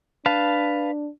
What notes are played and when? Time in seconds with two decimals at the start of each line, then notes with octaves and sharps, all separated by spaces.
0.26 D4 B4 F5 A5